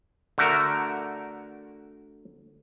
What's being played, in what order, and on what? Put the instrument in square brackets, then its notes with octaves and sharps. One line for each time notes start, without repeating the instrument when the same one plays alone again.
[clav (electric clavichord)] D3 A3 F#4 A#4